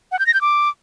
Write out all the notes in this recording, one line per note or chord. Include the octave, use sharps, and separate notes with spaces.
F#5
G6
A#6
G6
D6